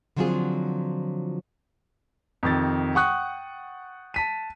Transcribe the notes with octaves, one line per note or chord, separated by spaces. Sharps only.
D3 F3 F#3 C4 F4 G#4
F2 C3 D#3 A6
F#5 G5 C#6 D#6 F#6
A5 B6 D#7